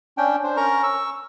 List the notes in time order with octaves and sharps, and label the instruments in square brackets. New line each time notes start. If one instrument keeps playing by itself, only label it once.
[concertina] C#4 D4 G5
D4 C5
C#4 A#4 A#5 C#6
C#6 E6